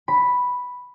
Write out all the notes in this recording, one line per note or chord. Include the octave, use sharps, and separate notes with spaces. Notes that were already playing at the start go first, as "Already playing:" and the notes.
B5